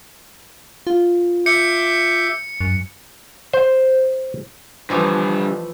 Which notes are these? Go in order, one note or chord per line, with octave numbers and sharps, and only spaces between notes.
F4
E5 D6 G6 C#7
F#2
C5
D3 E3 F3 G3 A3